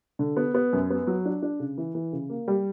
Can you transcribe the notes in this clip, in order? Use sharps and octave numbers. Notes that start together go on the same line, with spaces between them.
D3
B3
B3
F#2
B3
F#3
D4
D4
C#3
E3
E3
C#3
A#3
G3